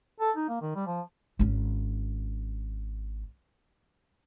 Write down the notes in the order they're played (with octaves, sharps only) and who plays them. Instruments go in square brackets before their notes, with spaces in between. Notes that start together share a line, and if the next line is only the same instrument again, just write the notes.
[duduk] A4
D#4
A#3
D#3
G3
F3
[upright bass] G#1 C#4